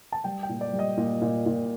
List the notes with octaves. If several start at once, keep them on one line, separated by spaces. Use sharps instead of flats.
A5
G3 G5
G5
A#2
D5
G3
D#5
A#2
A#2
A#2